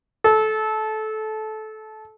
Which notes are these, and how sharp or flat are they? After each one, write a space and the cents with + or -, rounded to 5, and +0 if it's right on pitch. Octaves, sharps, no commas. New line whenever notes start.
A4 -20